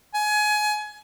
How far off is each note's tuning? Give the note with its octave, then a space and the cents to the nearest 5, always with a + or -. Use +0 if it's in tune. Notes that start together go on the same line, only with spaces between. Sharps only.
G#5 +25